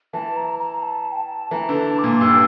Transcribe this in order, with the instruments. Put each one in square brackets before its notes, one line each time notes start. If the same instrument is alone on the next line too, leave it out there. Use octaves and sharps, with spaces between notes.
[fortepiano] E3 [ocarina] A5
[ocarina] A#5
A#5
A5
G5
A5
[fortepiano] E3 [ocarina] A#5
[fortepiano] D3
[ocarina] A5
D6
[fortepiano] A#2
[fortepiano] G2 [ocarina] E6